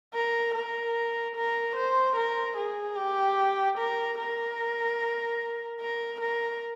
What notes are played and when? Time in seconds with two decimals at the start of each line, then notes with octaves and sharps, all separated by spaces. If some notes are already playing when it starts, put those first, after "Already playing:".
0.14 A#4
0.55 A#4
1.36 A#4
1.76 C5
2.16 A#4
2.57 G#4
2.96 G4
3.78 A#4
4.18 A#4
5.81 A#4
6.21 A#4